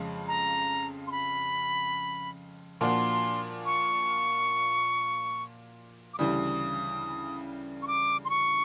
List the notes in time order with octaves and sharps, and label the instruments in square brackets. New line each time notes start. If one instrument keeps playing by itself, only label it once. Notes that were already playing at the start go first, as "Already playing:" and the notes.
Already playing: [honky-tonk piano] F2 C#3 F3 G#3
[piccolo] A#5
C6
B5
[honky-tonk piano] A#2 F3 A#3 D4 F#4 [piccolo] C6
[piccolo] C#6
D6
[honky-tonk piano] D2 C#3 E3 G3 [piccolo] D#6
[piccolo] C#6
D6
C6
C#6